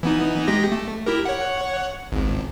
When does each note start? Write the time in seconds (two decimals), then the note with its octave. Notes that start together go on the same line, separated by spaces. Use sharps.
0.03 E3 B3 D#4
0.47 G#3 G4 A#6
0.72 A3
1.06 E4 G4 A#4
1.25 C#5 F#5
2.12 G#1 C#2